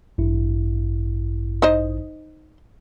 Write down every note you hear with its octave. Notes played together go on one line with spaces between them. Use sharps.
A1 G2 E4
D#4 C5 D#5